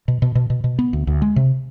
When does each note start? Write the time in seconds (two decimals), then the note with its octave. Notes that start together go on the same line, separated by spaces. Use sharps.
0.08 B2
0.22 B2
0.35 B2
0.50 B2
0.64 B2
0.79 B3
0.93 D2
1.07 D2
1.22 G#3
1.36 C3